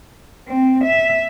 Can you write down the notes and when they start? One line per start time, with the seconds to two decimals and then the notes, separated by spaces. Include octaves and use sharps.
0.47 C4
0.85 E5